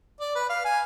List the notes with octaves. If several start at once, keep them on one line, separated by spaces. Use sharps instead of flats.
D5
B4
F5
G#5